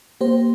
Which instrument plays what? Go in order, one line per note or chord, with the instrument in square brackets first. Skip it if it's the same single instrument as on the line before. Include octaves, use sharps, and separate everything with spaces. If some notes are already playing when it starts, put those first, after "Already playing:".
[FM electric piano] A#3 G4 C5